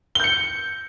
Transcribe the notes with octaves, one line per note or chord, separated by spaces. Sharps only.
G6 C#7 G7